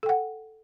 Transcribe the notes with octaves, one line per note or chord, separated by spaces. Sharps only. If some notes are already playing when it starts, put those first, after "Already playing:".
A4 F#5 G5